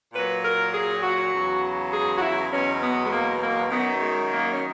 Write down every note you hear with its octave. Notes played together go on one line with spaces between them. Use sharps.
A#2 F#3 B4
A#4
G#4
F#4
E2 C#3 F#3
G#4
F#4
E4
E2 B2 F#3 C#4
B3
G#3
A#3
A#3
F#2 D#3 F#3 B3
G#3
A#3
C#4